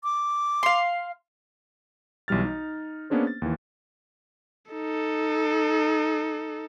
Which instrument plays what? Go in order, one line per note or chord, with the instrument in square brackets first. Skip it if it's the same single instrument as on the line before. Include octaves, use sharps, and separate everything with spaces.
[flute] D6
[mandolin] F5 C6
[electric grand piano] B1 E3 G3 F6 A6
D#4
A#3 B3 C#4 D4 G#4 C5
A6
D#2 E3
[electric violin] D#4 A4